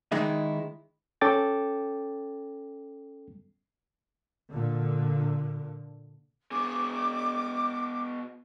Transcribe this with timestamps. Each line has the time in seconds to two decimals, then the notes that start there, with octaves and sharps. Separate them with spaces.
0.12 D#3 E3 G#3 D#4 E4
1.21 C#4 A4 G5 D6 A6
4.52 A#2 D3
6.51 B2 G#4 D6